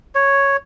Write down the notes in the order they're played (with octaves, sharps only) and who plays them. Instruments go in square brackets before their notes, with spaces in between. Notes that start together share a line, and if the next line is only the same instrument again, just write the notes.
[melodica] C#5